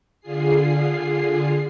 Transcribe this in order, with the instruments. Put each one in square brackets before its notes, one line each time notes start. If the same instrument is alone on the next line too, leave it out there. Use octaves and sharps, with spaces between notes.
[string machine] D3 F4 G#4 C7